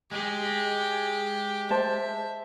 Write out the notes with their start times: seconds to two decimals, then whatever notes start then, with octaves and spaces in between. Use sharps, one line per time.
0.11 G#3 G4 G#4
1.70 C5 E5 A5